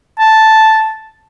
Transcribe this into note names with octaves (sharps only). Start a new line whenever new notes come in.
A5